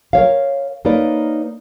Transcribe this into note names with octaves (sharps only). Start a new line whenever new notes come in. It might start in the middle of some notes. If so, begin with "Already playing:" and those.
A#4 C#5 F5
A#3 D#4 A#4 B4 C#5 D5